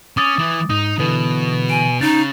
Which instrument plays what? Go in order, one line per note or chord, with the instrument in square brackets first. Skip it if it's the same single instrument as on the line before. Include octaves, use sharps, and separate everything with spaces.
[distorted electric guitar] C#4 [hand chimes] D6 D#6 A6
[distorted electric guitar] E3
[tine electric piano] G#2 [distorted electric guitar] D#4 [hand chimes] D#6
[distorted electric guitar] B2 [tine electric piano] D3 E3
[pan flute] G#5 [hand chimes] D7
[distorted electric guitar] C#3 [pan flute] D#4 [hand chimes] A6